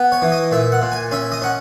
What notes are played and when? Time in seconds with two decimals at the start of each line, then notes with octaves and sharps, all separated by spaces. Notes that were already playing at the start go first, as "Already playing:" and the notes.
Already playing: B3
0.12 C#5
0.22 E3
0.32 D#5
0.52 A#2 E5
0.72 F#5
0.82 A#2
0.92 G#5
1.11 C#4 E5
1.32 D#5
1.42 C#4 F#5